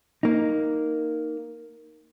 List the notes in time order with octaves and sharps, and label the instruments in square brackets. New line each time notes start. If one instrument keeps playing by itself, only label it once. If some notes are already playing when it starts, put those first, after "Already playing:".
[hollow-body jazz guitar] A#3 D#4